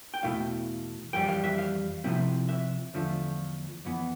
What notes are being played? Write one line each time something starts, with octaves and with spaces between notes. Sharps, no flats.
G5
E2 B2 A3 E4 F5
F2 E3 G3 G5
F5
E5
F5
C3 F3 C4 E4
E5
E2 D3 F3 A3
F2 E3 B3